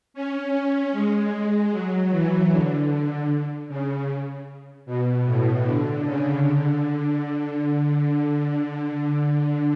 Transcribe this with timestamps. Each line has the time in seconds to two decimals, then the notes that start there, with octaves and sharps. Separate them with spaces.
0.14 C#4
0.54 C#4
0.92 G#3
1.71 F#3
2.11 E3
2.51 D3
2.89 D3
3.68 C#3
4.86 B2
5.25 A2
5.64 D3
6.05 C#3
6.43 D3